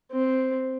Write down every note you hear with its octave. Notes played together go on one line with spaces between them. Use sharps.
C4